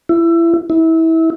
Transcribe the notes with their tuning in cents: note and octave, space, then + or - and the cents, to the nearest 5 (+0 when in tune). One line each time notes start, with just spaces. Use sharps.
E4 +25
E4 -25